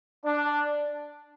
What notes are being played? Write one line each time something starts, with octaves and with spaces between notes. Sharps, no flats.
D4